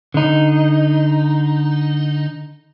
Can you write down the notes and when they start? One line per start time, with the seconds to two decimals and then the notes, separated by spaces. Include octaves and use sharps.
0.14 D3 D#4